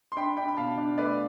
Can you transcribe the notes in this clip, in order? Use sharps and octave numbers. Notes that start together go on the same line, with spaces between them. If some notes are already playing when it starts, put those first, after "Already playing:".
C6
D4 G5 B5
D4 G5 B5
B5
B2 F5 A5
D4
A3 B4 D5